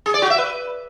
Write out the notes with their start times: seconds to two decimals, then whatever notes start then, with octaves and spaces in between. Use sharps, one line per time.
0.06 G#4
0.14 D5
0.22 F#4
0.30 E5
0.38 B4